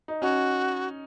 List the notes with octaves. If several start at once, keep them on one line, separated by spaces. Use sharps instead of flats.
D#4
C#4 F#4